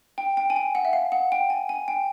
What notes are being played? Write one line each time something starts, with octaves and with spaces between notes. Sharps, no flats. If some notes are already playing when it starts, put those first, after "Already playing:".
G5
G5
G#5
G5
F#5
E5
F5
F#5
G5
G#5
G#5
G5